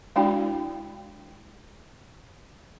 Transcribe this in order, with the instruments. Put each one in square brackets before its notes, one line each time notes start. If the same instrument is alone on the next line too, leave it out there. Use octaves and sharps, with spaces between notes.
[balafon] G#3 D4 E4 F#4 D5 G5